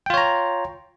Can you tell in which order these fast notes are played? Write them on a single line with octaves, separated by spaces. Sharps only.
G5 F4 C#5 A#5